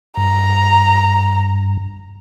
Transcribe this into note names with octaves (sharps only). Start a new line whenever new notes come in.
G2 A#5